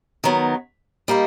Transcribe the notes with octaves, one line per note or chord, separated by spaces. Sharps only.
D#3 F#3 B3
G3 A#3 D#4